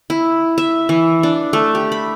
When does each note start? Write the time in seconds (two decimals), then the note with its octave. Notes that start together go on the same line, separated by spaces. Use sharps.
0.10 E4
0.58 E5
0.89 E3
1.23 D4
1.53 A3
1.75 G4
1.92 B5